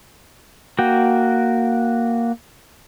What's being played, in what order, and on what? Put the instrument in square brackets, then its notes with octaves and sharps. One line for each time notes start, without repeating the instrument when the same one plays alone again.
[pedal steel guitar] A#3 F#4 G5